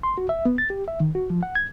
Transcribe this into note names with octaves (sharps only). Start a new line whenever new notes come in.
C6
F#4
E5
B3
A6
G4
E5
D#3
F#4
F3
F#5
G#6